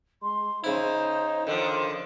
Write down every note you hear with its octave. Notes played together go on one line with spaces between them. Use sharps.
G#3 C6
C#3 D#4 E4 C5
D3 D#3 F3